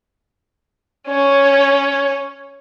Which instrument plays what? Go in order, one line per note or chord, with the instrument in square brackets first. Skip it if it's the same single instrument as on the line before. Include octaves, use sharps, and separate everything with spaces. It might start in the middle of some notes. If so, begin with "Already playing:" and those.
[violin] C#4 C#5